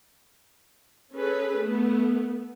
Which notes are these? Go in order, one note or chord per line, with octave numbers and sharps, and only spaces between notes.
C#4 G#4 A4 B4
A3 B3